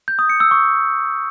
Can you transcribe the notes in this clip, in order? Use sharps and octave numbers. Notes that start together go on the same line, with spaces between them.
G6
D#6
C#7
E6
C#6